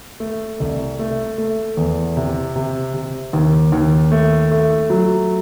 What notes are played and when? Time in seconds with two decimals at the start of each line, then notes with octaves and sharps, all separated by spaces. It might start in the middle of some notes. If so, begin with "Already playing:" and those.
0.20 A3
0.60 C2
0.99 A3
1.38 A3
1.77 E2
2.17 C3
2.56 C3
2.94 C3
3.33 D#2
3.72 D#2
4.12 A3
4.52 A3
4.90 F#3